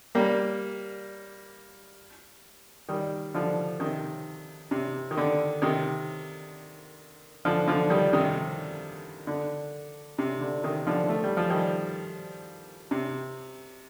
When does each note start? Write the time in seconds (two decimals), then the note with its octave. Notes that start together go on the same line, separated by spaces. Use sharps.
0.15 G3 A#3
2.89 D#3 G3
3.34 D3 F3
3.80 C3 D#3
4.71 C3
5.11 D#3
5.17 D3
5.62 C3 D#3
7.45 D3 F3
7.68 D3 F3
7.90 D#3 G3
8.13 C3 D#3
9.27 D3
10.19 C3
10.41 D3
10.64 C3 D#3
10.87 D3 F3
11.09 A3
11.24 G3
11.37 F3
11.50 D#3 G3
12.91 C3